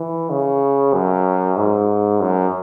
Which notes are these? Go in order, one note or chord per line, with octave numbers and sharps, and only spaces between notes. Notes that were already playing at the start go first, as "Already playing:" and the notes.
Already playing: E3
C#3
F#2
G#2
F#2